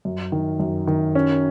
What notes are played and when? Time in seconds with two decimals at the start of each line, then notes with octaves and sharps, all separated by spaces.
0.05 F#2
0.32 D#3
0.60 F#2
0.87 D#3
1.15 C#4